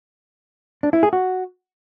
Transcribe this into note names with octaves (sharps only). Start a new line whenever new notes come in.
D4
E4
G#4
F#4